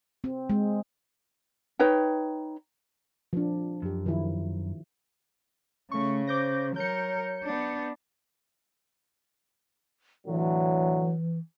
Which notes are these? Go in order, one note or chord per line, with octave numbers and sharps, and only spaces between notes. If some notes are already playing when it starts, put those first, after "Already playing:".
C4
G#3
D#4 B4 C#5 G5
F3 D4
F#2 F3 G4
D#3 F3 E4
C#3 A3 C#6
C5 D6 G6 A#6
F#3 A#4 C#5 G6 C#7
B3 D4
A2 D3 E3 F#3